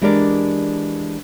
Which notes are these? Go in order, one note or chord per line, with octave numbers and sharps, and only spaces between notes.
E3 G#3 D4 G4 A#4 D5